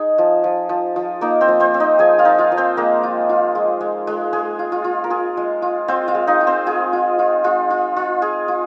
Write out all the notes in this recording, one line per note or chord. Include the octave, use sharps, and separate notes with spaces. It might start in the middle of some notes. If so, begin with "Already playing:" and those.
Already playing: D#4 G#4
F3
F3
F3
F3
A#3 D#4 A#4
C4 C5
F3
C4 C5
C4
D#4 D#5
F3 G#4 G#5
F4 F5
D#4
F4 F5
F3
C4 C5
G#3 A#3 A#4
F4
F4
G#3
G#3
G#3
G#3 G#4
F4
F4
F4
A#4
F4 G#4
G#3
F4
C4 F4 C5
F4 F5
G#3
D#4 D#5
F4
C4 C5
F4 G#4
F4
F4
G#3 F4
F4
F4
F4 G#4
F4